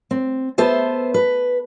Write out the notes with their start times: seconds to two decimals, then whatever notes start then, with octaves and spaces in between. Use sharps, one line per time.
0.11 C4
0.58 B3 A4 C5 E5
1.14 B4